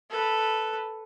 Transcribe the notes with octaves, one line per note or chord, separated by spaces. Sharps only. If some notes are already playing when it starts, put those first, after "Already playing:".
A4 B4